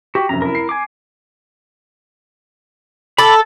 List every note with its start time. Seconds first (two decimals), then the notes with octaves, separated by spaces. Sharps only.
0.15 F#4 G4
0.29 F1 F#2 A#5
0.42 E4 A#4
0.55 C7
0.69 G#5 D6
3.18 A4 B5 D6